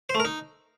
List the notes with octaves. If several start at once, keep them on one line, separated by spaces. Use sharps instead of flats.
C5
A3
A#4
D#4